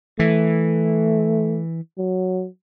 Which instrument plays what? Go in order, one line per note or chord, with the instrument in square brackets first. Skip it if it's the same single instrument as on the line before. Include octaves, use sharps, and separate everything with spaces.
[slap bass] E3 [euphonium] A3
[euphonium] F#3